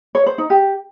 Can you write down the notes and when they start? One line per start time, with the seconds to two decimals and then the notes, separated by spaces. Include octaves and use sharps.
0.15 C#5
0.26 C5
0.38 D#4
0.50 G4